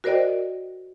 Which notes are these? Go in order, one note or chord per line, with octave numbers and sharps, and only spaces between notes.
F#4 A#4 C5 D5 D#5 G5